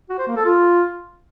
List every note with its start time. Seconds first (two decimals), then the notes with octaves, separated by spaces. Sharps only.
0.09 F#4
0.18 C5
0.27 A#3
0.36 A4
0.45 F4